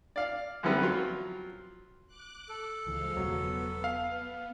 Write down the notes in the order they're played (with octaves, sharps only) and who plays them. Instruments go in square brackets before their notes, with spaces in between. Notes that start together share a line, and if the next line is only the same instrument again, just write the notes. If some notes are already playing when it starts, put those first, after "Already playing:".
[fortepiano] D5 F5
F#2 D3 E3 G3 B3 C4
F3 F#3 F4
[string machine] D6 F#6
[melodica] A4
[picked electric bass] C#2 E3 [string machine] F3 G#3 F4
[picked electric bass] E1 C#3 [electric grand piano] F#3 [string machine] B3
[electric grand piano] F5